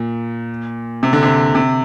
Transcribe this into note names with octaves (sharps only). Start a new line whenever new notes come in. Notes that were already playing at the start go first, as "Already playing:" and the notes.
Already playing: A#2
C3
D3
C3
C3